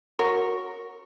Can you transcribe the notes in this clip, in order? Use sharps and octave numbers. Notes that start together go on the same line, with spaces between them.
F#4 A#4 C#5